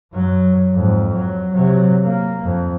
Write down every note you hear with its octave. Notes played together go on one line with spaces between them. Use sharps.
F#2 F#3
F2 G#2
F#3
C3 F#3
A#3
F2